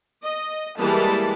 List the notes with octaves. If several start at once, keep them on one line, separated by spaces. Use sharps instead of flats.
D#5
E3 G3 G#3 A#3 A5